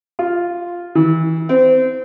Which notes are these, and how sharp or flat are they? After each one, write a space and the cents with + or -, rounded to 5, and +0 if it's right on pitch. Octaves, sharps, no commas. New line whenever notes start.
F4 +0
E3 -30
C4 -25